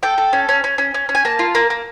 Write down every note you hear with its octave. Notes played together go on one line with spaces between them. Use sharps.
A4 G5
A4
C#4
C#4
C#4
C#4
C#4
C#4
G#5
A#3 A5
F4
A#3
A#3